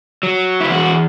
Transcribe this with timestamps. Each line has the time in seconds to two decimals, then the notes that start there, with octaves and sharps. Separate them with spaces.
0.23 F#3
0.60 E4
0.70 E2 F#4